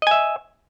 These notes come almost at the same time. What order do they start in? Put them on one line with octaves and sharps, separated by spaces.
D#5 G#5 E5